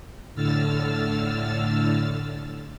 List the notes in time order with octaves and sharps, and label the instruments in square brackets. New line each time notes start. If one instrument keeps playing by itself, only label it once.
[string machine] A2 D3 E6 F6 A6